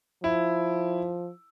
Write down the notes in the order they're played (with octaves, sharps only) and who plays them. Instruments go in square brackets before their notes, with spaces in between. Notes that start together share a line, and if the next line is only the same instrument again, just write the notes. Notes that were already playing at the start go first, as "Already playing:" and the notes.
[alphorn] F3 [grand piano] E4